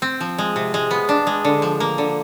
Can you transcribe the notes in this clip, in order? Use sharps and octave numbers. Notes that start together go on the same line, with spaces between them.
C4
F3
G#3
C3
G#3
B3
D4
G#3
D3
F3
A#3
D3